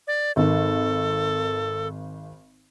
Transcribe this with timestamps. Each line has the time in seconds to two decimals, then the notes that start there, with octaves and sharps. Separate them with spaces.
0.07 D5
0.36 G#1 D#3 A4